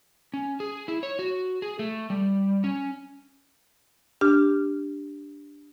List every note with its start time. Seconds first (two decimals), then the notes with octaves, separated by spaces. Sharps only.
0.34 C#4
0.60 G#4
0.88 E4
1.03 C#5
1.19 F#4
1.62 G#4
1.79 A3
2.10 G3
2.64 C#4
4.21 D4 G4 F6